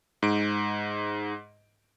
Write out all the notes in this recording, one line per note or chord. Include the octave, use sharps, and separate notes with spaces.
G#2 D7